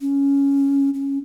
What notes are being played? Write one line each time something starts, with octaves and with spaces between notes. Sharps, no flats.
C#4
C#4